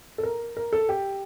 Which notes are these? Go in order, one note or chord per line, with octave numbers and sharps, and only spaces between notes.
A4
A#4
A#4
A4
G4